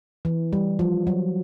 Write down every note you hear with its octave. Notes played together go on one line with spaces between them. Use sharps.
E3
G3
F3
F#3